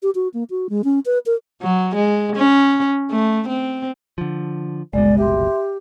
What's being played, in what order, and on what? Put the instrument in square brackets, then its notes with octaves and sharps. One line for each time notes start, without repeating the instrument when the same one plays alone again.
[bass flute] G4
F#4
A#3
F#4
G#3
C#4
B4
A#4
[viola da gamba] F#3
G#3
C#4
A3
C4
[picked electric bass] D3 F3
[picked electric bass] F#1 C2 B2 [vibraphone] G#3 [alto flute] D5
[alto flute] G4 [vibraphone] E5 C6